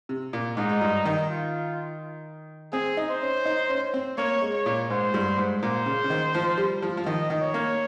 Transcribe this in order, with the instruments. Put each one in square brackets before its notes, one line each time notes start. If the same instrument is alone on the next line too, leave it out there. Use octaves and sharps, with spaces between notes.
[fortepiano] C3
A#2
[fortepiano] G#2 [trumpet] D#4
[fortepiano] G#2
G2
D#3
[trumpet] F4
[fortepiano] C4 [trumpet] G#4
[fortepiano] D#4
[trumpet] C5
[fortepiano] C#4
D#4
C#4
C4
[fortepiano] A#3 [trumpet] C#5
[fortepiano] G#3
[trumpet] C#5
[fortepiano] A#2
[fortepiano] G#2 [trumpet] C5
[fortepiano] G2
G#2
[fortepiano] A#2 [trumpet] C5
[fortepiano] C#3
C#3
D#3
F3
G3
F3
F3
[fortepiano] D#3 [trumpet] D#5
[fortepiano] D#3
[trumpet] C#5
[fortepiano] A#3